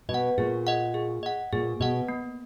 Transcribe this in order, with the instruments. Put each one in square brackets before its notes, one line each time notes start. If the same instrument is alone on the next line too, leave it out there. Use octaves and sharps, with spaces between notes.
[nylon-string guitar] B2 [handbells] D#5
[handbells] F#5
[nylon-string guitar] A#2 [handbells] G#4
[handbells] D#5 F#5
G#4
D#5 F#5
[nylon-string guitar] A#2 [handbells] G#4
[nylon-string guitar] B2 [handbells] D#5 F#5
[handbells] A#3